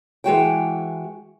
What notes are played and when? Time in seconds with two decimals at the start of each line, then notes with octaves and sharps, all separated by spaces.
0.24 E3 G#3 F#4 G5